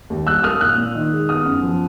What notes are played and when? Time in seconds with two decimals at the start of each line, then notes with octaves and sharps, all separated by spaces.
0.10 D#2
0.26 G3 E6 F#6
0.43 A#3 D#6 F6
0.61 A#2 E6 F#6
0.78 A#2
0.95 D#3
1.12 G#3
1.29 B3 D#6 F6
1.46 F#2
1.63 F3